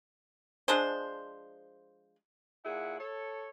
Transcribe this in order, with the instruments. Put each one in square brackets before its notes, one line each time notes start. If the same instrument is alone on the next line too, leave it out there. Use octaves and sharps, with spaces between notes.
[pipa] F3 G#3 D4 C5
[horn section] A#2 E4 G#4 F#5
A4 C#5